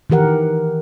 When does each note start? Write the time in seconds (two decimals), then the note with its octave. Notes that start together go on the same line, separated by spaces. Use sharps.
0.10 D#3 E3 G4 A#4 F#5